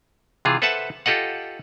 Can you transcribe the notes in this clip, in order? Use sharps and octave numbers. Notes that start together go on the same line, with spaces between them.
C3 E3 F4 G#4
A4 B4 C5 E5 F#5 A5
F4 G4 A4 D#5 F#5